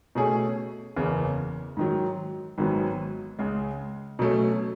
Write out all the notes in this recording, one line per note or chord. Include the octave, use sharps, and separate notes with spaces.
B2 A3 C#4 G#4
F#1 E2 C#3 E3 B3
G#2 D#3 F#3
G#1 G#2 F#3 B3
C#2 C#3 G#3
B2 F#3 A3 C#4